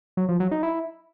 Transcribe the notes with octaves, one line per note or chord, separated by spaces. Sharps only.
F#3
F3
F#3
D#4
E4